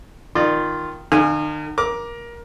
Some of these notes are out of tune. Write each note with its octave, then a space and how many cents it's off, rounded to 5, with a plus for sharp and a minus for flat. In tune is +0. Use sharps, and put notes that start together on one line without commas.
D#3 +0 F4 +0 D5 +40
D#3 -45 F5 +0 G#5 -5
A#4 +20 D6 +0